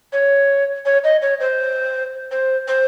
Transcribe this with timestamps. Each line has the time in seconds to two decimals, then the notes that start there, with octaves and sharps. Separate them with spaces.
0.13 C#5
0.86 C#5
1.04 D#5
1.22 C#5
1.40 C5
2.31 C5
2.68 C5